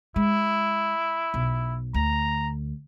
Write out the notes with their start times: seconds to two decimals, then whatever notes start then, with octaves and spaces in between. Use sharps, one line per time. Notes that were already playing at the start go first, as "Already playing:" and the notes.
0.16 G#3 E4
1.34 B1
1.94 D2 A#5